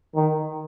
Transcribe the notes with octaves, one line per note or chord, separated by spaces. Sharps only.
D#3